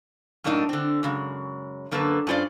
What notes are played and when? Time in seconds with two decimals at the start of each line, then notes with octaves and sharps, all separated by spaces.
0.44 F#2 A2 A#3 D4 D#4
0.69 D3 C4
1.03 F#2 C#3 G#3
1.91 F#2 D3 A#3 A4 B4
2.27 G2 C#4 F4 C5 D5